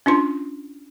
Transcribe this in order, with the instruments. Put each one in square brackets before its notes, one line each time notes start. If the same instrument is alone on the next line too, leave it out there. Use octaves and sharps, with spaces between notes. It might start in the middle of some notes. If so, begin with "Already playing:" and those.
[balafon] C#4 D4 F4 C6